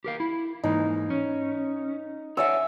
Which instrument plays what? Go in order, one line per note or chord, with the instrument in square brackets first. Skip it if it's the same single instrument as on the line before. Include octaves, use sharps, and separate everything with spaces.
[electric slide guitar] G4 A#4 F5
E4
[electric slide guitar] G#2 E3 A#3 [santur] D#4
[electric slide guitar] C#4
[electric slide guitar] C#5 D5 F#5 [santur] E5 G#5 E6